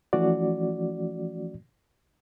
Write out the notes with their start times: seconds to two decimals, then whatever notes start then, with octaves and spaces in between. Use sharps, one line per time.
0.13 E3 F3 A3 C#4 F#4 D5